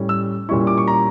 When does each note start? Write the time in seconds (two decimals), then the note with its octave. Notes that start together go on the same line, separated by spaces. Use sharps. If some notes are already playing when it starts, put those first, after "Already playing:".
Already playing: A2 G3 C#4 E4
0.09 E6
0.49 A#2 G3 C#4 E4 C#6
0.67 D6
0.78 C#6
0.88 A#5